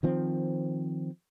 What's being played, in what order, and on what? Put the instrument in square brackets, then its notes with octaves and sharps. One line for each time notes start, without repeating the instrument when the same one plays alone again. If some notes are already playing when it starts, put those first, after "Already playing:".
[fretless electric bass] D#3 F3 C4